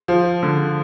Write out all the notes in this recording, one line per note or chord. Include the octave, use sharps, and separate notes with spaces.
F3
D3